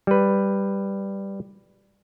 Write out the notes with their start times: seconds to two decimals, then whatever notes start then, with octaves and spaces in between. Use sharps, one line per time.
0.07 G3 B4